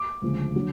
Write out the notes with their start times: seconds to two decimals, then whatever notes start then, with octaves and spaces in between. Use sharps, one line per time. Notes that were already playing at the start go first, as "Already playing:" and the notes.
Already playing: D6
0.22 D2 C#3 F3 G#3
0.56 D3 F#3